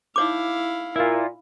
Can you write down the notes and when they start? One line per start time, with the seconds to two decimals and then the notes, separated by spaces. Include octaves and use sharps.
0.16 D#4 E4 C#5 F5 D6
0.96 A#2 E4 F4